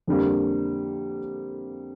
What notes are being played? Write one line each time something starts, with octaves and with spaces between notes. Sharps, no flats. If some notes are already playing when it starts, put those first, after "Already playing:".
F2 D3 G3 A#3